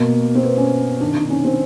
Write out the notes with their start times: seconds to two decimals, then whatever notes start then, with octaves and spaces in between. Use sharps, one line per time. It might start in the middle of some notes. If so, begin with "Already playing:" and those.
Already playing: B2 A#3
0.35 C4
0.43 B3
0.57 C#4
1.01 C3 D#3 D4
1.15 D#4
1.25 D4
1.30 C#4
1.45 C4